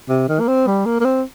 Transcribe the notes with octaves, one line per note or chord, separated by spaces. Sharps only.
C3
D#3
A#3
C4
G3
A#3
A#3
C4